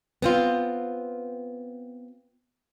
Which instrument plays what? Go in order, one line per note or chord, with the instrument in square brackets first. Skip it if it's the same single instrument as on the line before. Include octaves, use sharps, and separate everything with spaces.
[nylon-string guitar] B3 C4 F4